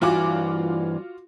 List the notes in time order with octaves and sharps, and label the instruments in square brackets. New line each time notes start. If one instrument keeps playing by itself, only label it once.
[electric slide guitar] G2 E3 G#5 [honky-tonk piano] F4 F#4 D6